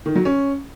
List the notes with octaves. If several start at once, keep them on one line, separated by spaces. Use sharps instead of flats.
D#3
F#3
C#4